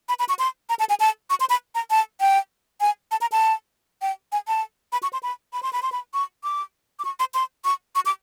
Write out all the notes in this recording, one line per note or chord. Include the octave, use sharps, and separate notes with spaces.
B5
B5
C#6
C6
A#5
A5
G#5
A5
C#6
C6
B5
A#5
A5
G5
G#5
A5
A#5
A5
G5
G#5
A5
B5
C#6
C6
B5
B5
C6
B5
C6
B5
C#6
D6
D6
C#6
C6
C6
C#6
C#6
D6